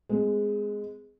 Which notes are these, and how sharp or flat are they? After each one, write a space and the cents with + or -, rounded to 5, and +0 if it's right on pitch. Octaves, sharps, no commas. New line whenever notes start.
G#3 +0 C4 -40